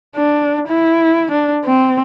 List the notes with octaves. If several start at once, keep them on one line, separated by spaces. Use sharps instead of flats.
D4
E4
D4
C4